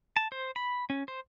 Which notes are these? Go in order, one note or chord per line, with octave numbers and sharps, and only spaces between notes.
A5
C5
B5
C#4
C5